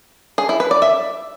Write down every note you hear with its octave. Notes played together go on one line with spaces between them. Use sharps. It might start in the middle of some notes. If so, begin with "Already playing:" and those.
G#4
E4
B4
D5
E5